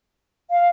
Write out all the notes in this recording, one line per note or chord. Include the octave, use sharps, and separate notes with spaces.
F5